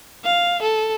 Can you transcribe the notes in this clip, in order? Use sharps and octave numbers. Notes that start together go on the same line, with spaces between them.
F5
A4